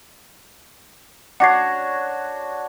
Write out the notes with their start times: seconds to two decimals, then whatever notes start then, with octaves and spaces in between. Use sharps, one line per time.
1.40 D4 F#4 C#5 F#5 C7